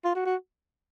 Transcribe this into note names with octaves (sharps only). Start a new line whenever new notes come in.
F4
F#4
F#4